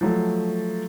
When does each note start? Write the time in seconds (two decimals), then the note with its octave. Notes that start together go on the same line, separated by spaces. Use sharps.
0.01 F3 F#3 A3